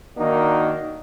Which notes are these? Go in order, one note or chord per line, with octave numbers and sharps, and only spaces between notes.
D#3 A#3 D4 D#4 F#4